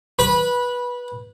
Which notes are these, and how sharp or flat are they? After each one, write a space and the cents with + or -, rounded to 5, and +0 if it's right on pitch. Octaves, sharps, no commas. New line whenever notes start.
B4 -15 B5 -20